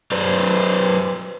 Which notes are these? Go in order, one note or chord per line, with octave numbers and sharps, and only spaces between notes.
F#3 B4 C5 D5